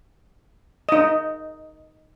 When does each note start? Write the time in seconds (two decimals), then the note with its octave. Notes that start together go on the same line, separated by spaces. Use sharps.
0.89 D#4 D#5